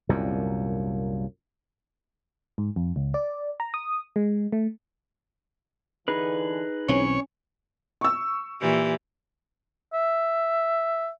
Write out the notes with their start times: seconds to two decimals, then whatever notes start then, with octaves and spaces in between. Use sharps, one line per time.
0.09 C2 F#2 A#2
2.58 G#2
2.76 F2
2.96 C#2
3.14 D5
3.60 A#5
3.74 D#6
4.16 G#3
4.52 A3
6.08 D3 E3 D#4 G#4 B4
6.88 B1 E3 C4 C#4 C#5
8.01 C#6 E6
8.60 A#2 E3 G4
9.93 E5